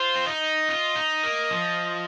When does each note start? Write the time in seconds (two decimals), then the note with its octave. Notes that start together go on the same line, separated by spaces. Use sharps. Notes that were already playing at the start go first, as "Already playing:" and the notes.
Already playing: F4 C5
0.16 C4
0.27 D#4 D#5
0.69 F4
0.96 D#4
1.23 A#3
1.50 F3